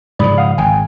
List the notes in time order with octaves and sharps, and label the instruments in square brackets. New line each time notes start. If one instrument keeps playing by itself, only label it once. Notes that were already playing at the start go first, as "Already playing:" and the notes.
[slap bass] G#2 C#3 F3 [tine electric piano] D5 B5 D#6
[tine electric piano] F5 F#5 D#6
[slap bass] G#1 [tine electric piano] G5 G#5